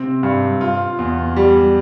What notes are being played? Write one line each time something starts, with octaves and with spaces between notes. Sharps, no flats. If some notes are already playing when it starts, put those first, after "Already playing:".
Already playing: C3 C4
G2
F4
E2
G3